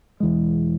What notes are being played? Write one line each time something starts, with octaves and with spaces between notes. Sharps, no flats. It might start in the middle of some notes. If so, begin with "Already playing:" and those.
E1 E2 E3 G#3